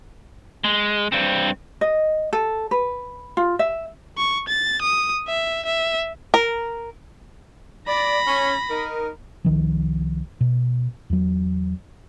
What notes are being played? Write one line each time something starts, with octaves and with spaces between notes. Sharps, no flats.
G#3
G2 C4
D#5
A4
B4
F4
E5
C#6
A6
D#6
E5
E5
A#4
D5 B5 A#6
C#4
D#4 A#4
C2 D#3 F3
B2
E2 F#3